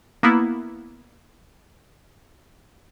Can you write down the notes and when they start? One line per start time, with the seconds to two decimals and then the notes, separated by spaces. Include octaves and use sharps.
0.23 A#3 B3 E4